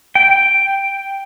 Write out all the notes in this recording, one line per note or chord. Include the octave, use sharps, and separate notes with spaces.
G5